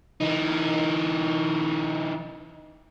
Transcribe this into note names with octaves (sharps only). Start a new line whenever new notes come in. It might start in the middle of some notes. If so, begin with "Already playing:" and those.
E3 D#4